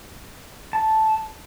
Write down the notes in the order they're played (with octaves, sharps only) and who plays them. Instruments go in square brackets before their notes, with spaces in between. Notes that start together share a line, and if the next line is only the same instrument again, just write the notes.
[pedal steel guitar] A5